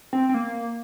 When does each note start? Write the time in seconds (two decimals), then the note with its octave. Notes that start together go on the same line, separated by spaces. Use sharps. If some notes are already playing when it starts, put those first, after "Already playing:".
0.13 C4
0.29 C4
0.34 A#3